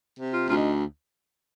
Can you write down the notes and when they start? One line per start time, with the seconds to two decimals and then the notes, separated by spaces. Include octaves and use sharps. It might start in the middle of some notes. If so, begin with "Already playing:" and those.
0.19 C3
0.33 F4
0.48 D2 F4
0.57 D#4